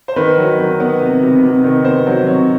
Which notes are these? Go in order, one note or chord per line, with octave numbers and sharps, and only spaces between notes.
C5
D#3 B4
F#3
D#3
B3
C3
C3
C3
D#3
B3 C5
F#3
C3 C#5